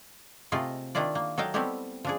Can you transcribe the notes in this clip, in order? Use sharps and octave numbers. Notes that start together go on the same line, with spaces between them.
C3 A3 F4 G#4 D#5 G#5
D#3 D4 E4 F4 D5
A#3
F#3 A4 D#5 F5 G5
G3 A3 B3 C4 E4 G4
F3 D4 G#4